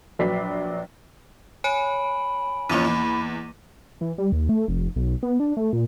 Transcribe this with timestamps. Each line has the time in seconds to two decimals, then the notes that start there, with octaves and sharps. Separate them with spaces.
0.19 A#1 F#3 B4 D5 B6 C7
1.64 C#5 G#5 B5 D7
2.70 E2 F3 A#3 C#4 D6 D#7
2.85 E2
4.01 E3
4.18 G3
4.32 D#2
4.49 A3
4.68 F1
4.96 B1
5.23 B3
5.40 D4
5.57 A3
5.73 A#2